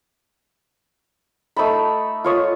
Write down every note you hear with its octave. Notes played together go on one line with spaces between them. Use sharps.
A3 D#4 A5 B5
F4 C#5 D#6